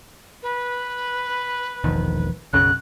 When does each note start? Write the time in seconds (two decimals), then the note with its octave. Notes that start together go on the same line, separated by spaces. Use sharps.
0.43 B4
1.84 E1 A#1 D#3
2.53 B1 F#2 C#3 F#6